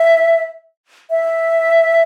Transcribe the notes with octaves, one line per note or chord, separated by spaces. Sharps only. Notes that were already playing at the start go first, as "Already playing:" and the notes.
Already playing: E5
E5